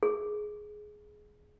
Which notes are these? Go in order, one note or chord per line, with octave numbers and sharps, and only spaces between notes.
G#4